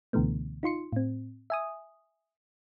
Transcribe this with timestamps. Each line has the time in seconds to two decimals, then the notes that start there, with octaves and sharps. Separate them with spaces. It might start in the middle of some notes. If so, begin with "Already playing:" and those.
0.13 C#2 B2 D3 E3 A3 B3
0.63 D#4 F4 C6 C#7
0.92 A2 C4
1.50 E5 G#5 D#6